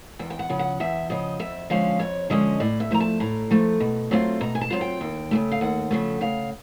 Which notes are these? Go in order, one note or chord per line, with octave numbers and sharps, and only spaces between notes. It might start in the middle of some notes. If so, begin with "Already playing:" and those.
E2 G5
G5
F#5
C#3 F3
F#5
E2 E5
C#3 F3 D#5
F2 E5
D3 F3 G#3 C#4 F5
F2 C#5
D3 F3 G#3 C#4 D#5
A2 D5
E5
F3 A3 A#5
A5
A2 A#5
F3 A3
B2
F#3 A3 C4 F4
B2 A#5
G#5
A5
F#3 A3 C4 F4
G5
D#2
C#3 F3 A3
F5
D#2 F#5
C#3 F3 A3
C#3 F5